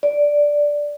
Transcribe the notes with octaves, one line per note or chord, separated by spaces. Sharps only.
D5